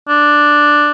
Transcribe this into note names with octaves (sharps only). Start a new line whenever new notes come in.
D4